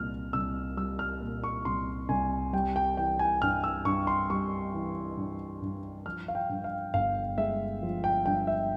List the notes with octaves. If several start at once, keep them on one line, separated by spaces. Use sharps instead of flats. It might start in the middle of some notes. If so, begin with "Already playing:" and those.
Already playing: C2 A#2 F6
C2 E6
G3 E6
F6
A#2
C#6
C2 C6
C2 G#5
G3 G5
G5
E3 G5
G#5
G2 F6
E6
G2 C#6
C6
G3 C#6
E3
G2
G2
F3 F6
F5
G5
G2
F5
G1 F5
G#3 E5
F3
G5
G2 G5
E5